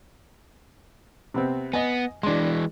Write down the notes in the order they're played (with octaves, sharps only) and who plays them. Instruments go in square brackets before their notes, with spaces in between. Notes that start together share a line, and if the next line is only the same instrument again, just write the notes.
[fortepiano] C3 B3 C4
[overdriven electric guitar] B3 [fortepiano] D#5 G#5
[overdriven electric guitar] E3 G#3 [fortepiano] D4 C6